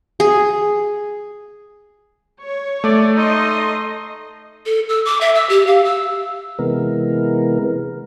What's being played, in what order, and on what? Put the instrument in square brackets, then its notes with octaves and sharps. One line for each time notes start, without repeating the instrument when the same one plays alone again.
[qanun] G#4
[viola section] C#5
[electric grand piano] A3 [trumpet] D5
[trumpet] D#4 [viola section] D#5 C6
[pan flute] A4
E6
D6
E5
E6
G4
F5
E6
[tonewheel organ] C3 E3 G#3 B3 A#4